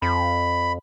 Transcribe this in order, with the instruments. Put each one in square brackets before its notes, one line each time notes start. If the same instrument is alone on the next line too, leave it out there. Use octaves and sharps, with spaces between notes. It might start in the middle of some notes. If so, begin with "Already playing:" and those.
[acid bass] F2 [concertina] B5